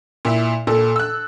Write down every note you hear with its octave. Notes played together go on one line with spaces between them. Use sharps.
A#2 E4 E5
A#2 A4
E6 F#6